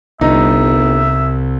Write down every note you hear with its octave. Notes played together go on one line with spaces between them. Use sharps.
G1 C2 D#4 E5